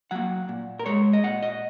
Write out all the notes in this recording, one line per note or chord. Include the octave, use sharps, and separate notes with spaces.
F#3 A#3 F#5
A#2
A#4
G#3 C#5
D#5
A#2 F#5
D#5